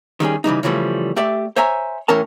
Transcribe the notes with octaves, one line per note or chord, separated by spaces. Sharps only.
D#3 G3 C#4 G#4
C#3 E3 G3 D#4
C#3 E3 F3 G3 A3
A3 G4 D5 E5
C5 C#5 E5 G#5 A#5
A2 E3 C#4 A#4 A5